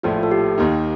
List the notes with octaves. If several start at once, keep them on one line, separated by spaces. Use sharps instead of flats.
A#1 A2 F3 A3 F4
A4
G4
D#2 D#3 A#3 D#4